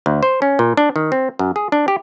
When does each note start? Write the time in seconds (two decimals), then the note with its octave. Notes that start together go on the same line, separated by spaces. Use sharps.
0.06 D2
0.23 C5
0.42 C#4
0.59 A#2
0.77 D4
0.96 D#3
1.12 C4
1.39 F#2
1.56 G#4
1.72 D4
1.88 G4